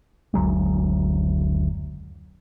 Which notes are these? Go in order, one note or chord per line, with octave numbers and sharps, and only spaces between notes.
F#1 D2 F#3 G#3